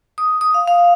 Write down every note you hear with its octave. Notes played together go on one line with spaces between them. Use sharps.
D#6
D#6
F5
F5